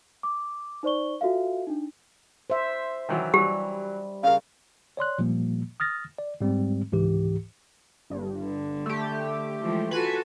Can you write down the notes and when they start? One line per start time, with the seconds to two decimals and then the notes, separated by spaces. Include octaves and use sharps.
0.23 D6
0.83 D#4 C5 D5 C#6 G7
1.21 F4 F#4 A4 E5 F5
1.67 D4 D#4
2.50 C5 E5
3.09 D#3 E3 F#3
3.34 E3 F#3 G3 G4
4.23 C#3 A#4 F5
4.97 C#5 D5 C6 F#6
5.18 A#2 F3 G3 A#3
5.80 D#6 F6 A6 A#6
6.18 D5
6.41 G#2 G3 G#3 C4
6.92 C#2 G#2 E3 G4
8.10 G1 G2
8.41 D3
8.86 A3 G4
9.63 E3 F3 G#3
9.91 F4 F#4 A4 B4 G#5